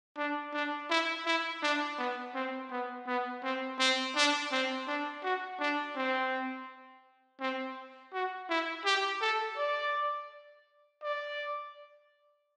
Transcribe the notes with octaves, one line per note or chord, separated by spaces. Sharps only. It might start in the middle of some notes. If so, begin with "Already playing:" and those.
D4
D4
E4
E4
D4
B3
C4
B3
B3
C4
C4
D4
C4
D4
F#4
D4
C4
C4
F#4
E4
G4
A4
D5
D5